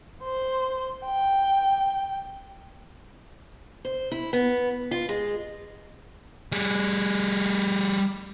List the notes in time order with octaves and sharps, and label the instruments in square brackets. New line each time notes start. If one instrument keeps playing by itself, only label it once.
[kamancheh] C5
G5
[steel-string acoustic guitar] C5
E4
B3
F4
G#3
[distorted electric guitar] G3 G#4